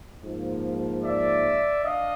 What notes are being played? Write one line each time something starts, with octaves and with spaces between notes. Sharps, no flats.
G#2 F3 A#3
D5 E5
D4 D#5 F5